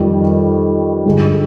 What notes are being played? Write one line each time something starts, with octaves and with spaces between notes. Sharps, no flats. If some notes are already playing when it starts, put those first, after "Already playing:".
Already playing: F2 D#3 G3
G2 D3 G#3